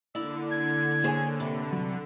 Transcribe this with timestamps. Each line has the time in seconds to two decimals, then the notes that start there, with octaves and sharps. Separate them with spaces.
0.15 D3 A#3 E4 D5 E6
0.51 G#6
1.04 A#3 G#4 C5 C#5 G#5
1.40 G2 C3 B5
1.72 C2 F#3